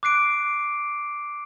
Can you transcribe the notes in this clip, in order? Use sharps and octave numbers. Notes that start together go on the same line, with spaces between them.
D6 F#6 C7 D7